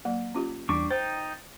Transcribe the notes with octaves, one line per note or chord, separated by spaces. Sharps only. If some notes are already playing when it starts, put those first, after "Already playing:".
F#3 A#3
C#4 F4 G4
E2 G3 D4 C#6 D6
D#4 C5 G5 A6